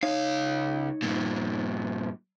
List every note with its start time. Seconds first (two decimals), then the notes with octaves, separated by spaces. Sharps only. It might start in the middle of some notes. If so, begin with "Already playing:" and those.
0.03 C#2 D#4 C#5 F5
1.02 G2 A#2